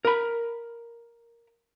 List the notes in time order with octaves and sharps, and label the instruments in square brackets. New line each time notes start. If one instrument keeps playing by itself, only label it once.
[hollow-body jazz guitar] A#4 B5